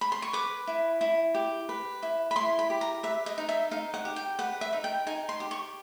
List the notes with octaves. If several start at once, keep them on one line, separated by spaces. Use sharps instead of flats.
B5
C6
C#6
B4 D6
E4
E4
G4
B4
E4
B5
E4 C6
B5
G4
A#5
B4 E5
D#5
D#4
E5
D#4 F5
F#5
G4
G5
B4 F#5
E5
D#4
G5
D#4 G#5
C6
G4
C#6